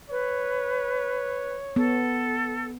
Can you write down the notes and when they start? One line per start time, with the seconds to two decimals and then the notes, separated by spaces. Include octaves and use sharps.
0.10 B4 C#5
1.76 B3 A4